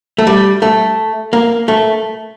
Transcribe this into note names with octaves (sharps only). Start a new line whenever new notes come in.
A3
G3
A3
A#3
A3